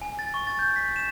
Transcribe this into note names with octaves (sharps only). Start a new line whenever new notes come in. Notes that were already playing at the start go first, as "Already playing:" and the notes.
G#5
A6
C#6
A6
G6
B6
E7